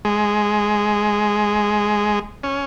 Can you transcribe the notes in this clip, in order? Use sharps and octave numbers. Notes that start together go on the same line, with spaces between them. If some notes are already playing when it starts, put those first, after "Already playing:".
G#3
C#4